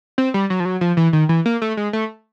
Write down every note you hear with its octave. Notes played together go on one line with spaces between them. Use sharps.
C4
G3
F#3
F3
F#3
F3
E3
D#3
E3
A#3
A3
G#3
A3